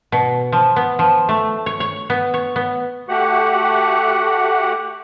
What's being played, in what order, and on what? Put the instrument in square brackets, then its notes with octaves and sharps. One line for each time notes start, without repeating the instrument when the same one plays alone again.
[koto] B2
F3
B3
F3
A3
C#5
C#5
B3
C#5
B3
[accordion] A3 F#4 G4 F#5